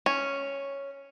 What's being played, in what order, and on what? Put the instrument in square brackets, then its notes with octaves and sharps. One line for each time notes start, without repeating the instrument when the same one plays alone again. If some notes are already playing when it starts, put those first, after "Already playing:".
[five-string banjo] C#4